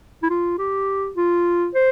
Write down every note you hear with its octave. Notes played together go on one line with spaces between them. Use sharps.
E4
F4
G4
F4
C5